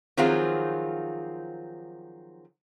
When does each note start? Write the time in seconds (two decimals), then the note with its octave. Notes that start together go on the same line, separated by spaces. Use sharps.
0.17 D#3 F3 F#3 C4 F4 G#4